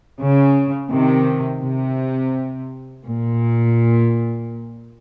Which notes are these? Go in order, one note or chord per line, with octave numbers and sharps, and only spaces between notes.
C#3
C3 D#3
C3
A#2